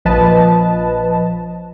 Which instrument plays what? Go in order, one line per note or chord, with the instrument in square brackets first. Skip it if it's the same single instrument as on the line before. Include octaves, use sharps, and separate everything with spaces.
[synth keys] A#1 F3 B4 D#5 A5